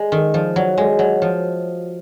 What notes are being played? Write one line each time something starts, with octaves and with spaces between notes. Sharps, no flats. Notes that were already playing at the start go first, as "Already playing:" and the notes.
Already playing: G#3
D#3
F3
F#3
G#3
F#3
F3